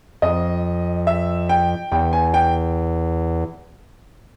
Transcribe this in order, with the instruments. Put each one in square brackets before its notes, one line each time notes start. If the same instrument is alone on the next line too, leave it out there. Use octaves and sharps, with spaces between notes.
[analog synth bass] F2 [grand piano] D#5
[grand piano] E5
G5
[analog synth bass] E2 [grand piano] G5
[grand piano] G#5
G5